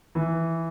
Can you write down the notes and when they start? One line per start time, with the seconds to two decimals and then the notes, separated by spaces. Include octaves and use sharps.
0.15 E3